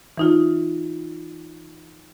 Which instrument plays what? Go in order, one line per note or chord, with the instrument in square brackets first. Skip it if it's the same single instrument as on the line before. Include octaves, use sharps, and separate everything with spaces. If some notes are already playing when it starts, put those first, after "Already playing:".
[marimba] E3 D#4 F4